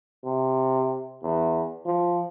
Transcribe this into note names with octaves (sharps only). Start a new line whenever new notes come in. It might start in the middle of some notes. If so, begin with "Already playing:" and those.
C3
E2
F3